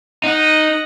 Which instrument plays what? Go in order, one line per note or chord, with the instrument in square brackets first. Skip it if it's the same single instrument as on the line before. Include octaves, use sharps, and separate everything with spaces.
[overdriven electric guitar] D#4 [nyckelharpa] D#5 F#5